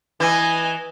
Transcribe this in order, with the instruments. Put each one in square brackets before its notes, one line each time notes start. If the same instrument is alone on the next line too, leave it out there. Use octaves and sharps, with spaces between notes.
[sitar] E3 [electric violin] D#5 G#5